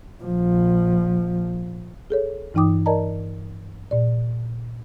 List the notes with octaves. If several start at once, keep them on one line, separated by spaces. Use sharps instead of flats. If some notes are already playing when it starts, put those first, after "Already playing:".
A#1 F3
G#4 A4 C#5
G2 E3 D#4 G5 D6 D#6
A#4 D5 D#5 A5 A#5
A#2 D5